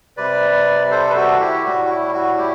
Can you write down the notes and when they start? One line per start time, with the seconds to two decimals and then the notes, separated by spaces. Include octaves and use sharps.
0.17 C3 G3 B4 D5
0.91 A4 C5
1.09 B4
1.16 F#4 A4
1.40 E4 G4
1.64 A2 G3 F#4
1.85 F#4
1.89 E4
2.13 F#4
2.38 E4 G4